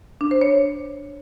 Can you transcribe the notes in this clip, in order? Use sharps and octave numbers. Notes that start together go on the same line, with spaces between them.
D4
C5
C#5